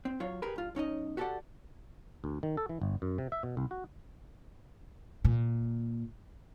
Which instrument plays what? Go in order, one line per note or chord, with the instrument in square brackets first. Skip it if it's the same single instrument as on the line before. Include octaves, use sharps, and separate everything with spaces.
[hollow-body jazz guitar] C4
F#3 F4 C#5
G4 G#4 A#4 B4
G2 F4
B1 C#4 D#4 D#5
F#4 G4 A4 B4 D5 F#5
[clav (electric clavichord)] D2
D#3
A4
E3
G1
F#2
C3
E5
B2
C2
F#4
[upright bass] A#2